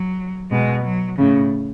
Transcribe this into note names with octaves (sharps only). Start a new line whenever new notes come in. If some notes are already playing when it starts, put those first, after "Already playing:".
Already playing: F#3
B2 G#3
F#3
A2 C#3